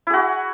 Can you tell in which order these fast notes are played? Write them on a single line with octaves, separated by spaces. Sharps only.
E4 G#4 F#4